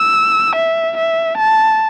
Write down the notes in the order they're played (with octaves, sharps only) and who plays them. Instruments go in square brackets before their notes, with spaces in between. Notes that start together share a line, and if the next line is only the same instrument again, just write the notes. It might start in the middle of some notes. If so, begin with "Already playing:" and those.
Already playing: [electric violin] E6
E5
E5
A5